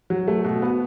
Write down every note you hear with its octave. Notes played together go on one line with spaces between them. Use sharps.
F#3
A3
B2
B3